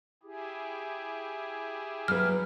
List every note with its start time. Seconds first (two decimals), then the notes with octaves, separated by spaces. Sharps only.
0.23 E4 G4 G#4
2.08 F#3 B4 F6